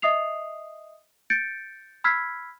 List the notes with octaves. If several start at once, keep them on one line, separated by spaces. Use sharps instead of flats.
D#5 E5 D#6 C7 F7
G6 A6 C#7 D7
B5 E6 F6 G#6 B6 C7